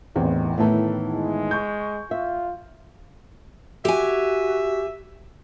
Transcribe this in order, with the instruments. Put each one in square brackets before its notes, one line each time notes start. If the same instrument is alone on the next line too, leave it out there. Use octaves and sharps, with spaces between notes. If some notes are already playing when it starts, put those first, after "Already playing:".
[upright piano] A1 E2 [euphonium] D#3 [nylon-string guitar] C4
[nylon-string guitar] A2 D#3 E3 [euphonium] A3 [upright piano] B3 E4 A5
[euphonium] G#3
[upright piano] C#6 G6
[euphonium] F4 [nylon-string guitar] E5
[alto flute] F#4 [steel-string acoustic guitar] G4 G#5 [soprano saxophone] E5